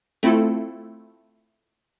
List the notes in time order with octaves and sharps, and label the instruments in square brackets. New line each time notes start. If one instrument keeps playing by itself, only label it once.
[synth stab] A3 C4 E4 F4 A4